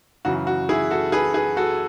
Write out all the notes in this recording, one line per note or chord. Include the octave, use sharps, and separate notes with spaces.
F#2 C#3 E3 F#4
F#4
E4 G#4
F#4 A4
G#4 B4
G#4 B4
F#4 A4